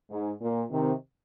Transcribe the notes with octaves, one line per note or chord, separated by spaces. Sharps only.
G#2
A#2
C3 D#3